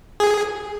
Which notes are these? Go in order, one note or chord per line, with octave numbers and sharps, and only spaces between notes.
G#4